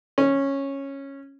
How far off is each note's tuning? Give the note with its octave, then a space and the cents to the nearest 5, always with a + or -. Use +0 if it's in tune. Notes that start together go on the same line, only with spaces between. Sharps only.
C#4 -10